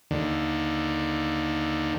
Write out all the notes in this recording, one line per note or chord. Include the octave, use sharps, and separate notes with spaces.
D#2 D3